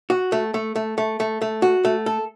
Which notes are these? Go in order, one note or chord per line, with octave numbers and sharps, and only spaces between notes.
F#4
A3
A3
A3
A3
A3
A3
F#4
A3
A4